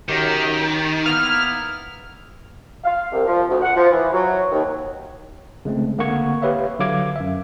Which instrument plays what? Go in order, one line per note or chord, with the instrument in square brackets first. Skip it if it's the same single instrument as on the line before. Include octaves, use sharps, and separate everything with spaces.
[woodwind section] F#2 G4 [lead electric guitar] D#3
[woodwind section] A#3 B3 E4 [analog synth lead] F6
[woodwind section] F5
C2
F3
D2
F#5
F3
E3
F#3
D#2
[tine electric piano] C#3 G#3 A3 C4
D3 A#3 C4 F#5 C#6 G#6
G4 B4 C#5 E5 F5
D3 F#3 F5 D6 G#6
F#2 E5